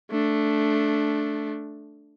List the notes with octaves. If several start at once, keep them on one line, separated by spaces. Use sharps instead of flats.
A3 D4